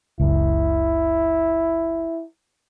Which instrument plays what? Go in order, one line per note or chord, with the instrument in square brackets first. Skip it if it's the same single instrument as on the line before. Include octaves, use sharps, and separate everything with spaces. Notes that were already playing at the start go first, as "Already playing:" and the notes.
[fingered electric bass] F#1 C#2 [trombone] E4